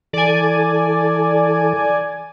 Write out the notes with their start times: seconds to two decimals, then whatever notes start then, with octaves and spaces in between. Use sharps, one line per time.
0.13 E3 A4 D5 G#5